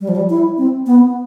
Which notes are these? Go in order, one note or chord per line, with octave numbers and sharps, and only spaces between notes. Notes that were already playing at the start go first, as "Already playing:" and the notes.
G3
F3
G3
E4
C4
B3